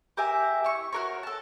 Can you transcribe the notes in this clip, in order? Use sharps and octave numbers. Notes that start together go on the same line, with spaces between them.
G4 A#4 E5 G#5
E4 C#6
F#4 A#4 C#5
A4 A5